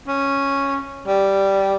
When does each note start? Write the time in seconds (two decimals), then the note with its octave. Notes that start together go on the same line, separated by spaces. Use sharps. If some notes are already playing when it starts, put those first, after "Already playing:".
0.08 C#4
1.07 G3